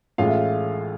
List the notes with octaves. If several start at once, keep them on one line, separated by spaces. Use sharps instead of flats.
A1 A2 G#3 F4 F5
E5